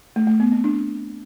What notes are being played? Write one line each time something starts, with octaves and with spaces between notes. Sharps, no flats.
A3
A3
B3
C4
D4